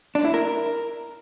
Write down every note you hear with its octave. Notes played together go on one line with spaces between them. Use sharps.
D4
E4
A#4